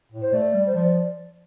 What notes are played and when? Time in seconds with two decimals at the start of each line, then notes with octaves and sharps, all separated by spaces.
0.12 A2
0.21 C5
0.33 A3 D5
0.54 G3
0.66 C5
0.74 F3 D5